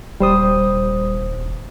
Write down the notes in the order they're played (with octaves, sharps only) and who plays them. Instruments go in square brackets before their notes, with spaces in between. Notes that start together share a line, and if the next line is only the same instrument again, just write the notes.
[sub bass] D#1 [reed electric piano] G3 C5 D#6